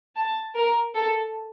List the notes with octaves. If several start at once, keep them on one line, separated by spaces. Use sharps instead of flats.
A5
A#4
A4